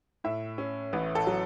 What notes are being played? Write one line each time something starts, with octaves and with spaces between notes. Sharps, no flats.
A2 E5
C#4
A1 B4
A4
F#3